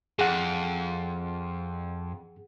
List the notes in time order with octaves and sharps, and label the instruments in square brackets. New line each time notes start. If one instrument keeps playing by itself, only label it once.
[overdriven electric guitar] F2 [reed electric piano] G#4 F#5